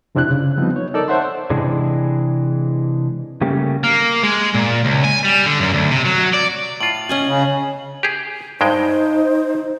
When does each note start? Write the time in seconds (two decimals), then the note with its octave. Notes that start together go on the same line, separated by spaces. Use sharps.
0.15 F2 C3 C4 D4 E4 F#6
0.31 C#3
0.58 F3 G3 B3 C4 D#4
0.76 C#5
0.94 D#4 A4 A#4 D5 E6
1.08 C5 C#5 E5 F#5 A5 C6
1.50 C3 E3 G#3 D4 G#4
3.41 C#3 G3 A3 A#3 G4
3.84 A#3
4.23 G#3
4.54 A#2
4.85 C#2
5.04 G#5
5.24 G3
5.46 D3
5.60 F#2
5.74 D2
5.91 C3
6.05 F#3
6.34 D5
6.81 A2 F4 F#7
7.09 C#4 D#5 G#5
7.27 C#3
8.03 G4 G#4
8.61 G2 G#3 D#4 C5 G5